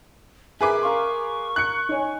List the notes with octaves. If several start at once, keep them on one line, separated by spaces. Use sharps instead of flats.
G#4 A#4 B4 E5 D6
A#4 F5 C6 C#6
F#6 C#7
D#4 C#5 G#5